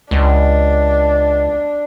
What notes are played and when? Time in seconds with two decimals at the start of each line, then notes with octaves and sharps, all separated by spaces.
0.11 C#2 D4